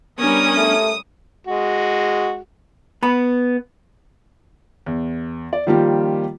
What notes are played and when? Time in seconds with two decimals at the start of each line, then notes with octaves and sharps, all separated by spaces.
0.19 G3 B3 C#4 D4 A#4 D#6
0.57 A3
1.47 G#3 F#4
3.03 B3 B5
4.86 E2
5.53 D5
5.67 D#3 F3 G3 A#3 F4 G4